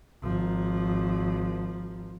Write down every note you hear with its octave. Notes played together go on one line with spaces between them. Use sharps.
G#1 F3